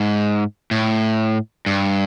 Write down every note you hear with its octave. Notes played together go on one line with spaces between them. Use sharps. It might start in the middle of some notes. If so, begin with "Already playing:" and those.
Already playing: G#2
A2
G2